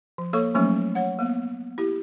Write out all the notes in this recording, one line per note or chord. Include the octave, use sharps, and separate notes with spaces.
F3
A#3 A4 C#5 C#6
F3 F#3 A3 A#3 C#4 D#4
C#5 F#5
A#3 B3
E4 G4